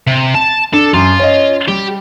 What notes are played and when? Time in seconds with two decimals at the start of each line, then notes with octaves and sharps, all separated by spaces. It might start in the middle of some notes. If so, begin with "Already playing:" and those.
0.07 C3
0.34 A5 E7
0.73 D4 A4
0.94 F#2 F4
1.19 C#4 D#5
1.68 G3 G4